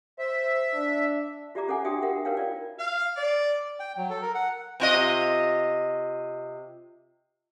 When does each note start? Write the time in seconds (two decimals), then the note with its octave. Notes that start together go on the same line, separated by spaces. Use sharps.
0.19 C5 E5
0.74 D4
1.55 F4 G4 D5 E5 A#5 D6
1.68 C#4 A4 C#5 F#5 G#5
1.84 D4 F#4 E5 G5 G#5 D#6
2.02 F4 G4 A#4 E5 F#5
2.25 D#4 A#4 B4 C#5 F5 G5
2.37 F4 D5
2.79 F5
3.16 D5
3.80 G5
3.97 F#3
4.10 A4
4.22 A#4
4.35 F#5
4.80 C3 F4 D#5